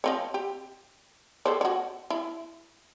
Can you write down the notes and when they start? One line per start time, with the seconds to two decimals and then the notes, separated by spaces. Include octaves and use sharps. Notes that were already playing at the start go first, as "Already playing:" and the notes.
0.04 F3 C4 C#5
0.34 G4
1.46 A4 C5 C#5
1.61 F#4 C#5
2.10 E4